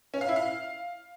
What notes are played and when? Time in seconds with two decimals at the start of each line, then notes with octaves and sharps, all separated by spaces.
0.14 C#4
0.21 F5
0.29 E4
0.36 F5